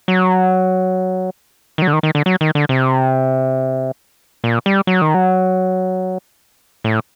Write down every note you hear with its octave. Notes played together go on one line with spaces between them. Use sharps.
F#3
D#3
F#3
D3
D#3
D#3
D3
F#3
D#3
D3
C3
A#2
G3
F#3
D#3
F#3
A2